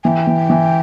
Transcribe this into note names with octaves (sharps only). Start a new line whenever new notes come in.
E3 G5 G#5
E3
E3